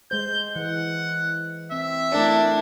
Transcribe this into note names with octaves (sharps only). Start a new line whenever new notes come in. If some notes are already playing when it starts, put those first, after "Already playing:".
G#3 C5 G6
E3 F#5
C4 E5
A3 D4 E4 A#4 D5